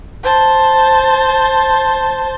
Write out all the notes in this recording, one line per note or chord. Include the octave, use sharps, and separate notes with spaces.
C5 A5